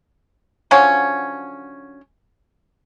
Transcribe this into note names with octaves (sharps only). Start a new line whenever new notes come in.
D3 F3 F#3 C#4